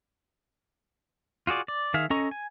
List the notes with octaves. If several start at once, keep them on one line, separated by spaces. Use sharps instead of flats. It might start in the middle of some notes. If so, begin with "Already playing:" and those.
F4 F#4 G#4 D5
D5
D#3 G#4 E5 F5
C#4 A4 D#5 A#5 C#6
G#5